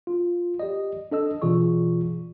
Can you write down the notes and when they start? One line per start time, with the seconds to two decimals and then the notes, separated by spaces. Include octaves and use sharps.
0.07 F4
0.60 G4 D5 D#5
1.12 D4 A4 D#5 E6
1.42 B2 E3 F4 G#4 D5 C#6